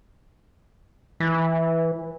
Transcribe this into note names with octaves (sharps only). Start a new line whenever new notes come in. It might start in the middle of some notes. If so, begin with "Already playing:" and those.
E3